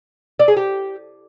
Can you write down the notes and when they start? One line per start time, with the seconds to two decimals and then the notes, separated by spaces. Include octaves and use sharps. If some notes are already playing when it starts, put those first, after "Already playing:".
0.39 D5
0.48 G#4
0.56 G4